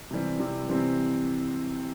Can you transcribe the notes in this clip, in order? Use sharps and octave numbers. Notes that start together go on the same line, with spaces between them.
C3 E3 G3 C4
C3 E3 G3 C4
C3 E3 G3 C4